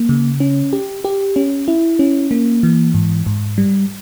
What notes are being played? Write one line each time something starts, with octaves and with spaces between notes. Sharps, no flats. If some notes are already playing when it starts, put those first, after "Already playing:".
Already playing: A#3
C#3
C#4
G4
G4
C#4
E4
C#4
A#3
E3
G#2
G#2
G3